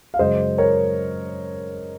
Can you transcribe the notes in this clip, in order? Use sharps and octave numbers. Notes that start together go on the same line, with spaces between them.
F5
F#2 C#3 G#3 C5 D#5
A#4 C#5